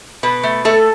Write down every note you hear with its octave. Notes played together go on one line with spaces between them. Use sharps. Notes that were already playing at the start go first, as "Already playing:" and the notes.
B2 B4
A3
A3 A4